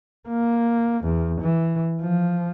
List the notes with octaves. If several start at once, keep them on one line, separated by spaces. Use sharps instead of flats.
A#3
E2
E3
F3